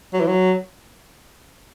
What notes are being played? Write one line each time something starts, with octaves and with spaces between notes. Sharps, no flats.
F#3
E3
F#3